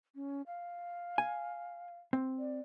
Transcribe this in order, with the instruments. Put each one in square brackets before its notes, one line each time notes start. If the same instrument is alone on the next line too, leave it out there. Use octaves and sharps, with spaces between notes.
[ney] C#4
F5
[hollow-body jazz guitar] G#5
C4
[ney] D5